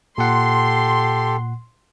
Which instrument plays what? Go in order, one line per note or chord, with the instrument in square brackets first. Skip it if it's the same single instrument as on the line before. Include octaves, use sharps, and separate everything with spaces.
[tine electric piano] A#2 F#5 [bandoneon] G4 A4 [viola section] C6